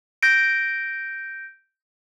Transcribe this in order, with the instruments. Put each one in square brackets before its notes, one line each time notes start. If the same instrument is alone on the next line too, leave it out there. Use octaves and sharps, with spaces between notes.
[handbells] G6 A#6 D7